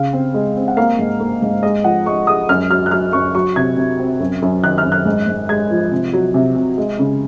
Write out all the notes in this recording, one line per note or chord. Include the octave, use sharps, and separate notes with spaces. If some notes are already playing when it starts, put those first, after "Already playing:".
Already playing: C#3 F5
C4
G#3
C4
F#5
A#3 F5
G#2
A#3
G#2
G#3 D#5
F3 F#5
G#3 C#6
G#3 D#6
F#2 F6
F#3 F6
F#6
F#3 F6
F#2 C#6
F#3 C#6
C3 G#6
C3
C4
F#2
F#2
D#3 F#6
F6
F#2
F#6
G#2
G#2
G#3 G#6
F3
C3
F#3
C3
C3
G#3
C#3